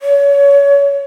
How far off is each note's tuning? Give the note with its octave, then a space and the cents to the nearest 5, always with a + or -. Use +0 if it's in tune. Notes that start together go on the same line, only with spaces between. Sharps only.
C#5 +30